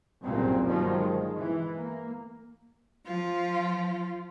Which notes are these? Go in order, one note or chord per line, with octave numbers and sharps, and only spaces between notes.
F#1 B1 G2 A#2 C#3 C4
G1 G2 D#3 F3 F#3 A#3
G#3
E3
A#3
F3 F4